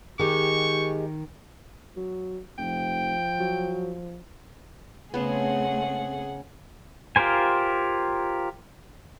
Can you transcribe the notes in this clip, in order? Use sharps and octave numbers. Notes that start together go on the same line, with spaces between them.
D#3 G#3 G4 C#6
F#3
F1 F3 G5
F#3
C#3 A3 B3 C4 G#4 F#5
F4 G4 A#4 C5 G#5